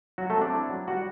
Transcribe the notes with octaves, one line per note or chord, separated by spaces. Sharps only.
F#3 F#4
A3 A4
C4
D4 D5
E4
F#3
G3 F#4 F#5